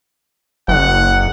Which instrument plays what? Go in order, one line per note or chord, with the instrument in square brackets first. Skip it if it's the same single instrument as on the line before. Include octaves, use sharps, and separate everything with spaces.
[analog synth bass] F#1 [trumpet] F#5